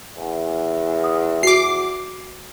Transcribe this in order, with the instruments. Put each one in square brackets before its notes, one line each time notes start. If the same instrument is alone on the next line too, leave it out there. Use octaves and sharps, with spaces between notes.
[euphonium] E2
[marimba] D#6
[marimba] F#4 [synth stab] D6 C7